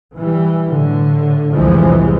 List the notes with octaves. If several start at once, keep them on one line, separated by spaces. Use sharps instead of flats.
E3 G3
A2 D3
C2 F2 A2 E3 F3 G#3